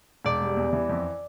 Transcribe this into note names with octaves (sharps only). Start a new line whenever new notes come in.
E1 D5
G3
E2
E3
F2